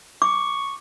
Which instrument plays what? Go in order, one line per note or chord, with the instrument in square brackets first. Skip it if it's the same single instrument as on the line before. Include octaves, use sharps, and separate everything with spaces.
[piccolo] C#6 [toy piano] D6